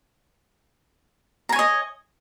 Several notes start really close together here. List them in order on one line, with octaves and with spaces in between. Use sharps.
A#5 G#5 C#5 D#5